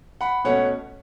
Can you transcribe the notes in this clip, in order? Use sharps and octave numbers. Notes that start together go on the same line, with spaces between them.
F#5 B5
B2 A3 C#4 C#5 F#5